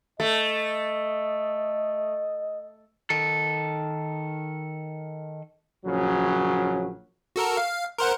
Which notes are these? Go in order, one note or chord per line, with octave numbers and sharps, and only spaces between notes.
A3 D#5
D#3 A4
A#1 C#3 F#3
F#4 A4 A#4
F5
A#4 C5 F#5